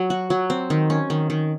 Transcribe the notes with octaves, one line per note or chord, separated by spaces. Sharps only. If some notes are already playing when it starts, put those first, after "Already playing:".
Already playing: F#3
F#4
F#3
C4
D#3
C#4
D#3
D#3